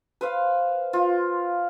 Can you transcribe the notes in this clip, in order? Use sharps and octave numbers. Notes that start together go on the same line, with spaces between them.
B4 C5 F5
F4